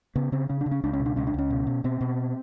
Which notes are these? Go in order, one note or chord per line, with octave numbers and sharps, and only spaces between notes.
C#3 B3
C#3 C4
C#3 C#4
D4
C#3
C#4
C#2 D4
C#4
B2
D4
C#2 C#4
D4
C#2 C#4
B2
B2
B2 C4
B2